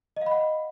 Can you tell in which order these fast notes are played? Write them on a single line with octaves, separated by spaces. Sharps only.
D#5 F5 B5 F#5